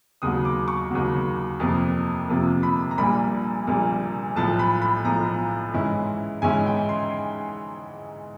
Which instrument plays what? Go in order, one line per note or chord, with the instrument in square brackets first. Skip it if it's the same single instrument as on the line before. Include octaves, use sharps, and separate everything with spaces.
[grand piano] D#2 C#3 F#3 D#6
D6
C#6
D#2 C#3 F#3
F2 C3 F3 A#3
F2 C3 F3 A#3
B5
A#5
A#1 A#2 G3 A#3 B5
A#1 A#2 G3 A#3
B1 A2 F3 A5
B5
B5
B1 A2 F3 A#5
G#2 E3 G#3 C#4 E4
G#2 E3 G#3 C#4 E4 G#5
G5
C6